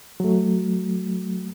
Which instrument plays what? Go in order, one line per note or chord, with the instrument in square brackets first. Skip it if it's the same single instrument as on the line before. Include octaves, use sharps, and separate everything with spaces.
[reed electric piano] F#3 A3